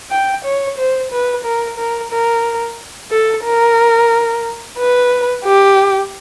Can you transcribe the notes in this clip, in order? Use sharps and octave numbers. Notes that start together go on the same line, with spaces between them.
G5
C#5
C5
B4
A#4
A#4
A#4
A4
A#4
B4
G4